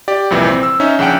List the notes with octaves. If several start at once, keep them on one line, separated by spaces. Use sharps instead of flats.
G4 D5
C2 F2 A#2 E3
C4
E6
C#4 D#4 E5
A#1 C#3 D4 F#5 G5